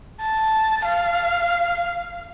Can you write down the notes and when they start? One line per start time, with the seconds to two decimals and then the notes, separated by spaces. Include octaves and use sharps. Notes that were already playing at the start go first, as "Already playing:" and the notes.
0.21 A5
0.85 F5